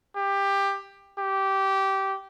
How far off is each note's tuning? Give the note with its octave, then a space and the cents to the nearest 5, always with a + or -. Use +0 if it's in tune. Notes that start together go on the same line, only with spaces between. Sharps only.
G4 +15
G4 -15